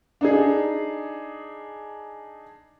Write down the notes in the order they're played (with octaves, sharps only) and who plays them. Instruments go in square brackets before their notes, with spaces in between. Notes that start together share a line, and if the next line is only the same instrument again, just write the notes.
[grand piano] D4 D#4 G#4